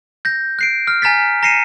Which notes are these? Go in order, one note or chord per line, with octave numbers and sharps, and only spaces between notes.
G6 A#6
F#6 C7 D7
F6
G#5 A#5 F6 A6 B6
A#5 A#6 C7 C#7 D#7 E7